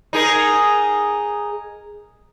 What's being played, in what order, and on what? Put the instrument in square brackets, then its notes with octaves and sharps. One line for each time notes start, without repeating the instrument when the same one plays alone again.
[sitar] D#4 G#4 A#4